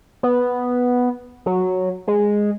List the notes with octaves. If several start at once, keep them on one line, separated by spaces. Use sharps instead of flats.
B3
F#3
G#3